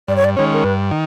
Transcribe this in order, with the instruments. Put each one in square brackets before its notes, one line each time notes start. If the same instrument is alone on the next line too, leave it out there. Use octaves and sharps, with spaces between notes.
[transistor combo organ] G2 [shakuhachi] D5
[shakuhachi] C#5
D5
[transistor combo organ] D#3 G#3 C#4 [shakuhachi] C#5
[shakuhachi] A#4
[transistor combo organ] G2 [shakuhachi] B4
[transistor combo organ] D#3